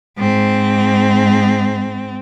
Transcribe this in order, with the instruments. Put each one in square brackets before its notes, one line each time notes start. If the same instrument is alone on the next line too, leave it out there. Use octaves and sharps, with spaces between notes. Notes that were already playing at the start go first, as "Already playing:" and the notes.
[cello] G#2 C4